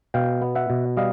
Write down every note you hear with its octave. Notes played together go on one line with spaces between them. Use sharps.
B2 F5 G5
B3
E5 F#5
B2
G3 D#5 F5